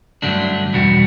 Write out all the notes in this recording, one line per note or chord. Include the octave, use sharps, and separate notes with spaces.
G2 D3 F#3 A3 D4
E2 B2 G3 D4 F#4